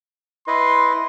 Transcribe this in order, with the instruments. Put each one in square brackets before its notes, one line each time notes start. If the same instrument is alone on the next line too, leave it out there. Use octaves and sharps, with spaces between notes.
[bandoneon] E4 B4 D#5 [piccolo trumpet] C6